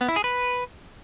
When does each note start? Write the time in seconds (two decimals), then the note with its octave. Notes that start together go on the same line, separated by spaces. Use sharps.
0.01 B3
0.08 E4
0.16 G#4
0.24 B4